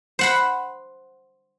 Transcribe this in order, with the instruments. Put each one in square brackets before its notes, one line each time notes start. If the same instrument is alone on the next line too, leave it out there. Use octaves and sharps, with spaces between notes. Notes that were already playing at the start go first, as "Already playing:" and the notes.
[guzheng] C5 F#5 B5